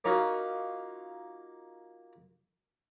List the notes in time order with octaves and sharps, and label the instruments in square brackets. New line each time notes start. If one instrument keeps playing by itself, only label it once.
[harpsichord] A#3 C#4 D#4 F4 F#4